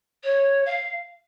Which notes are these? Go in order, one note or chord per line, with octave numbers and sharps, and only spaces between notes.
C#5
F5